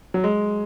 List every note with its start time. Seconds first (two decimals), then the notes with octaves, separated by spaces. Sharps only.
0.14 F#3
0.24 G#3